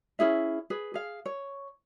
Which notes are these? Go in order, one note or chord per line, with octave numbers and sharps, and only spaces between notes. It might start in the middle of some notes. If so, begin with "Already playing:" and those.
C#4 E4 G#4 E5
G#4 B4
G#4 F5
C#5